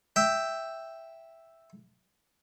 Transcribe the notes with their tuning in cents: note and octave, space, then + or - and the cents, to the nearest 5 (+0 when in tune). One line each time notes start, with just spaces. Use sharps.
E5 +0 G5 +0